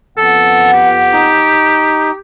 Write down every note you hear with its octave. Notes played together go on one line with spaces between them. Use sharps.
F2 B3 A4 F#5
G4
D#4